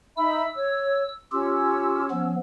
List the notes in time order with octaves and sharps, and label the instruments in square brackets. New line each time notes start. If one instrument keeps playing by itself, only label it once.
[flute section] D#4 E5 B5 [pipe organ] E6
[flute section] C#5
[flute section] C#4 E6 [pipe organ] F4 G4
[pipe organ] F3 B3